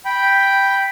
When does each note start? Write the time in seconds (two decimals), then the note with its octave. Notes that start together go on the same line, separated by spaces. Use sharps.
0.05 G5 B5